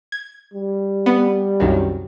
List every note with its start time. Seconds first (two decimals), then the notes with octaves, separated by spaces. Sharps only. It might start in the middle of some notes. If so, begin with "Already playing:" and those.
0.12 G#6
0.54 G3
1.06 B3
1.60 C2 F#2 D#3